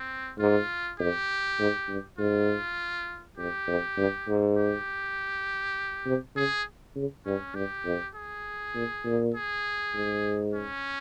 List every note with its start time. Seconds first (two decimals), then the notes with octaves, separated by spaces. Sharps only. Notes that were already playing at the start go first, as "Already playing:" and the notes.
Already playing: C4
0.39 G#2 F4
0.99 F2 G4
1.59 G#2
1.89 G2
2.18 G#2 F4
3.38 F2 G4
3.68 F2
3.97 G2
4.28 G#2
4.57 G4
6.06 C3
6.36 C#3 G#4
6.96 C#3
7.25 G2 C#4
7.55 G2 G4
7.85 F2
8.15 G#4
8.75 A#2
9.05 A#2
9.35 G#4
9.94 G#2
10.54 C#4